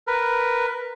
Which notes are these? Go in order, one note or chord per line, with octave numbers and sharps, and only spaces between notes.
A#4 B4